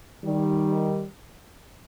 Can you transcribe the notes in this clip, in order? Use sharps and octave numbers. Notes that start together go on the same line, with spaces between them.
D#3 G3